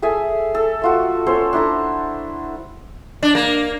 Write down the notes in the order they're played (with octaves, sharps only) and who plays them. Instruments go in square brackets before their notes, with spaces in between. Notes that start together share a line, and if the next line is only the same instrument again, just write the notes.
[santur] G#4 A4 E5 G#5
A4
A3 F4 F#4
C#4 A4 C5 C#5
D4 E4 A4 A#5
[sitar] D4
A#3